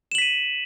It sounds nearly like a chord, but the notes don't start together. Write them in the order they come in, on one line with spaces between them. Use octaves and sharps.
E7 F#7 B6 D#7